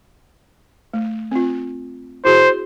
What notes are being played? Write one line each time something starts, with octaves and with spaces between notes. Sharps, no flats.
A3
C4 F4
E4 F#4 G#4 C5